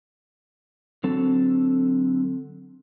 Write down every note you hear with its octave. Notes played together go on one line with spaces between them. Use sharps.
D3 F#3 C4 A4